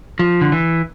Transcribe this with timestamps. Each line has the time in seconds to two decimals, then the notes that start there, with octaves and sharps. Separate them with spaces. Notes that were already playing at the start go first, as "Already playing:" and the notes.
0.19 F3
0.41 D3
0.52 E3